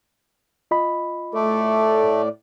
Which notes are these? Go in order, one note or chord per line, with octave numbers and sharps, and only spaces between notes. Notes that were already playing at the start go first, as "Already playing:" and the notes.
F4 D#5 B5
A2 A3 A4 D5